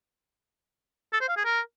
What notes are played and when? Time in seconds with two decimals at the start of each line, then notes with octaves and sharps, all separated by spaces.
1.13 A4
1.21 C5
1.29 F5
1.37 G#4
1.45 A#4